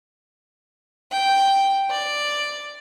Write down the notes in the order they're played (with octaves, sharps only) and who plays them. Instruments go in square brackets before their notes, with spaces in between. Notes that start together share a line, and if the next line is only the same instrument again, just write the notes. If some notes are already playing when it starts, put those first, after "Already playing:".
[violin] G5
D5